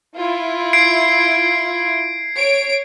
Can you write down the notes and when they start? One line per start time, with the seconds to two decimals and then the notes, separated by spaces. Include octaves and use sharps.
0.15 E4 F4
0.73 G#6 C7 D7
2.37 C#5 D7